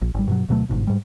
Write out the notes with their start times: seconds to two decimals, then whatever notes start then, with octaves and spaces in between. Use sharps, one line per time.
0.02 A#1
0.15 G#1 G3
0.28 G2 B2 F#3
0.49 D2 B2 F#3 A3
0.69 G1 G#2 B2
0.87 G#2 G3